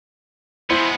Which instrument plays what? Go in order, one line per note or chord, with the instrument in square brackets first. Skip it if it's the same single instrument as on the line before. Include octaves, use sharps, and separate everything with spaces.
[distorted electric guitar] G#3 B3 [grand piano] E4 C5